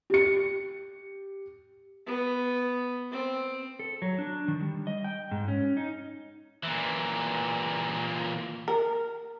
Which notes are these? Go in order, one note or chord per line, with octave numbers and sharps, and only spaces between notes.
G4 C#7
B3
C4
A4
F#3
D4
D#3
G3
D#5
G5
G#2
C#4
D#4
A#2 E3
A#4